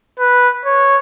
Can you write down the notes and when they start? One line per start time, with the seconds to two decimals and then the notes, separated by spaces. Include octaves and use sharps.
0.19 B4
0.65 C#5